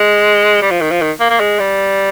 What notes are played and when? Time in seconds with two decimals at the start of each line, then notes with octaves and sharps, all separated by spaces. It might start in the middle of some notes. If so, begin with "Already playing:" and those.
Already playing: G#3
0.62 G3
0.71 F3
0.81 D#3
0.91 F3
1.01 D#3
1.20 A#3
1.30 A#3
1.40 G#3
1.59 G3